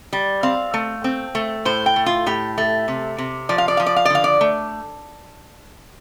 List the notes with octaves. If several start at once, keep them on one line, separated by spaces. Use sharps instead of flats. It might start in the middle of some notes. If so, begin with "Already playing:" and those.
G3
C4 F5
A3
C4
A3
A2 C5
G5
A3
F4
A2 G4
A3
C3
C3
F3 D5
F5
D5
F3 F5
D5
F5
D5
D3 F5
D5
A3